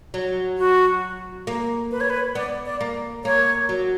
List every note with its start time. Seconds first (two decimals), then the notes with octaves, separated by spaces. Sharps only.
0.14 F#3
0.58 F#4
1.47 A#3
1.91 B4
2.01 C#5
2.10 B4
2.35 B3 D5
2.66 D5
2.81 A#3
3.25 A#3 C#5
3.69 F#3